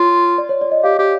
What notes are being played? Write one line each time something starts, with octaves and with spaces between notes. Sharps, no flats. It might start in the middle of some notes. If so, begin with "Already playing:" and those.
Already playing: F4 C#5
D5
C#5
D5
D#5
G4 F5
G4